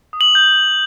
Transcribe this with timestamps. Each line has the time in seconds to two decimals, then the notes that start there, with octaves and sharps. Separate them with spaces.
0.13 D#6
0.21 F#7
0.35 G6